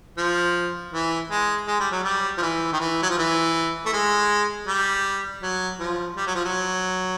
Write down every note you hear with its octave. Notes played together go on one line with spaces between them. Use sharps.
F3
E3
G#3
G#3
G3
F#3
G3
F3
E3
D#3
E3
F#3
F3
E3
A3
G#3
G3
F#3
F3
G3
F#3
F3
F#3